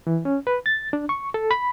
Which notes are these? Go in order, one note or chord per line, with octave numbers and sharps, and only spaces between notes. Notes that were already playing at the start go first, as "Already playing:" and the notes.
E3
C#4
B4
A6
D4
C#6
A4
B5